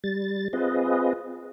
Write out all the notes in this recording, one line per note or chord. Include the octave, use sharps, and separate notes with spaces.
G3 A6
C4 F4 G#4 B4 D#5